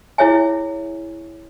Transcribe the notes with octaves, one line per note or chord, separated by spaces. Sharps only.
E4 G#4 C#5 E5 G#5